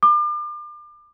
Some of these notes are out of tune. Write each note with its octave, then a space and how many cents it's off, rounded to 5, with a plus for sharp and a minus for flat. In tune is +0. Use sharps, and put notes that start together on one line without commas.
D6 +35